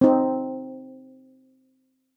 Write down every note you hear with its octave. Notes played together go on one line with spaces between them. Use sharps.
C4 D#4